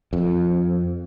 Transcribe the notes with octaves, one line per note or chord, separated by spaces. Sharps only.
F2